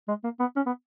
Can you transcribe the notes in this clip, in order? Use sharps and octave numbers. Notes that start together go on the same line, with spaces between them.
G#3
A#3
B3
C#4
B3